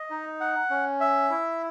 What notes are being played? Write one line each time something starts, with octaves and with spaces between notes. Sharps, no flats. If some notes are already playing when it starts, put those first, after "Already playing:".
Already playing: D#5
D#4
F#5
C#4
E5
E4